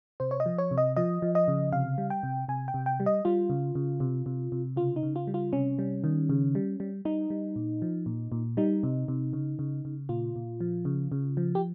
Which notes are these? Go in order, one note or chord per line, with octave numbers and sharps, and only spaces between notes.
C3 C5
C#5
D#5
F3
C#5
C3
D#5
F3 D#5
F3
D#5
C#3
C3 F5
G3
G5
C3
C3 G#5
G5
C3
G5
G3
D#5
G3 F4
C#3
C#3
C3
C3
C3
C#3 F4
D#4
C#3
F4
G3
F4
C3 C#4
G3
D#3
C#3
G3
G3
G3 D#4
G3
A#2
F3
A#2
A#2
G3 D#4
C3
C3
C#3
C#3
C#3
A#2 F4
A#2
F3
C#3
C#3
F3
G4